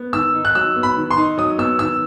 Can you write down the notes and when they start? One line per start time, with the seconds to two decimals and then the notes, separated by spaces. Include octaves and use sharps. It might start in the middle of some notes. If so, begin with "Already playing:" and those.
Already playing: B3
0.13 D#3 E6
0.34 D#4
0.45 F#6
0.55 F#3 E6
0.76 B3
0.83 B5
0.96 D#3
1.11 C6
1.18 D#4
1.38 F#3 D#6
1.58 B3 E6
1.79 D#3 E6